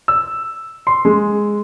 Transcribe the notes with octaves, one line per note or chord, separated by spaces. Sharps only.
E6
C6
G#3